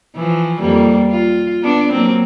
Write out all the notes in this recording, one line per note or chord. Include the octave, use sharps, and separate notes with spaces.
E3 F3
F2 G3 A#3
F4
B3 D4 D5
F#3 A#3 C4